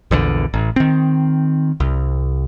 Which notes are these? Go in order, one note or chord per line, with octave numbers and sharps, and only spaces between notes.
A#1 E2 D3
A1
D#3 C4
C2